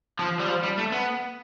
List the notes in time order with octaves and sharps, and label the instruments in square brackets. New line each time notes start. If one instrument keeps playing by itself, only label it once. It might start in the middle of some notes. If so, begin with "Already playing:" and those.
[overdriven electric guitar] F3
G3
F3
G3
A3
B3